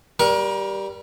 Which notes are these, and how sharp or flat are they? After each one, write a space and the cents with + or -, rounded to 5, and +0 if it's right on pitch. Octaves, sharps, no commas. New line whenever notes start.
G3 +0 A#4 +30 C#6 +5